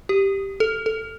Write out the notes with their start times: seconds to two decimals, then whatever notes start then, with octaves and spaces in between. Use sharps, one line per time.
0.09 G4
0.60 A4
0.86 A4